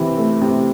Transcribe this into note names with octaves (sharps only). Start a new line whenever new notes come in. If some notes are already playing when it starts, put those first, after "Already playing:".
Already playing: C3 E3
A3
C3